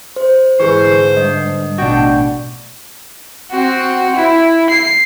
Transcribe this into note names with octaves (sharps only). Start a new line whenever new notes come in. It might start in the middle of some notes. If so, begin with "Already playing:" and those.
C5
G#2 D3 E3 G#4 B4 C5 C#6
G2 D#5
A1 B2 D4 F#4 G5
C4 F#4
E4
C7